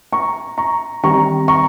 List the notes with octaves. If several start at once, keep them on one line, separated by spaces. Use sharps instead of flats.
A#5 C#6
A#5 C#6
D#3 G3 C4 A#5 C#6
A#5 C#6